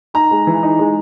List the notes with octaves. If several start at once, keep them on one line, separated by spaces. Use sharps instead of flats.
D#4 A#5
G#3
E3
D#4
G#3